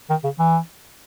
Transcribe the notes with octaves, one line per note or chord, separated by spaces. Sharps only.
D#3
C#3
E3